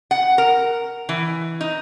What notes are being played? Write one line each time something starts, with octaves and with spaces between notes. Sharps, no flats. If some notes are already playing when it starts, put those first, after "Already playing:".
F#5
A#4
E3
D#4